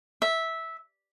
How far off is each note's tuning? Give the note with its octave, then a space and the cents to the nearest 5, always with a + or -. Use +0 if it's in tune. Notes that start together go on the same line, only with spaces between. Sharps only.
E5 -10